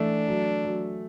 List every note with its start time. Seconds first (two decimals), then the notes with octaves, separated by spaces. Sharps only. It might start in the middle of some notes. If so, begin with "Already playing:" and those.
Already playing: E3 A3 D4
0.28 F#3
0.65 F#3